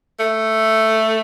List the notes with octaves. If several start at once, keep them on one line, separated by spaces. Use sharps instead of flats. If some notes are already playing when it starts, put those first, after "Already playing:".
A3